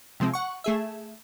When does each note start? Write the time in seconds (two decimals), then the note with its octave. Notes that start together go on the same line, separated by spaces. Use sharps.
0.20 C3 F3 G#3 C4
0.34 F#5 C#6
0.64 A3 G#4 E5